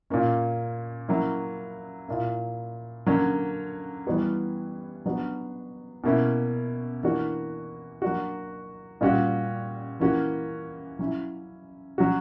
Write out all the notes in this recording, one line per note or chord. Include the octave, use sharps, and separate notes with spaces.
A#2 A#3 C#4
F#3 A#3 C#4 E4
A#2 A#3 E4
D3 F#3 A#3 C#4
E3 G3 B3 F#4
F#3 B3 D4 F#4
B2 A#3 C#4 E4
E3 A#3 D4 F#4
F#3 A#3 D4 F#4
A#2 G3 C#4 F#4
E3 A#3 C#4 F#4
F#3 C#4 E4
F#3 C#4 F#4